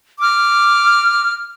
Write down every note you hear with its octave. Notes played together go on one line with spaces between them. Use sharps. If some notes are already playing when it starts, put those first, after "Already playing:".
D6 F6